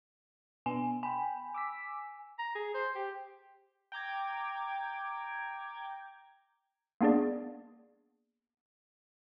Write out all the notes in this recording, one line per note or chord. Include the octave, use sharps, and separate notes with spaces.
B2 B3 D4 G#5
G5 G#5 B5
D6 E6 B6
A#5
G#4
C5
G4
G5 A#5 D6 G#6
A#3 B3 D4 G#4 D5